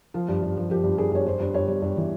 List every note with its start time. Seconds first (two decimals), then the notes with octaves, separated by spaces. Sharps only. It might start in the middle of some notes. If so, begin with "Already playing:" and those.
0.14 F3 F4
0.28 G2
0.43 G2
0.57 F3
0.70 F3 G4
0.84 G2
0.98 G2 G#4
1.12 G2 C#5
1.26 G2 C5
1.40 G2
1.54 G2 C#5
1.68 G3
1.82 G2
1.97 E3